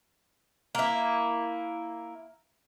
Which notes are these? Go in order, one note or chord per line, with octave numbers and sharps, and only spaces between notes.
A#3 E4